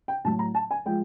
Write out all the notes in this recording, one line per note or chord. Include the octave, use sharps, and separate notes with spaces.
G5
A2 F#3 A5
A#5
A5
G#5
F3 G#3 G5